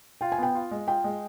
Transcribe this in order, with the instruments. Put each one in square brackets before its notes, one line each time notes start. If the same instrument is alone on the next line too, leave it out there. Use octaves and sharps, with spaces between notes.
[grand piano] F4 [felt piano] G5
[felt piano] G#5
[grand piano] B3 [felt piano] G5
[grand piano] F4
G#3
[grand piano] F4 [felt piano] G5
[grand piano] G#3